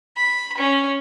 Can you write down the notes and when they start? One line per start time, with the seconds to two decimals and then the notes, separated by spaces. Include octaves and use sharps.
0.17 B5
0.58 C#4